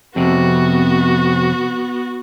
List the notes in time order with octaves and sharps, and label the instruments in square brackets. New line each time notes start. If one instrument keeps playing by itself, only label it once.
[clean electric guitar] F2 C3 [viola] B3 F#4